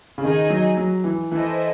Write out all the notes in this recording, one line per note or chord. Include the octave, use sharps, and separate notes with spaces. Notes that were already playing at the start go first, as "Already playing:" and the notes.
C#3
D#3 D#4 G#4 D#5
F#3
F#3
E3
E3 E4 A4 C5 D#5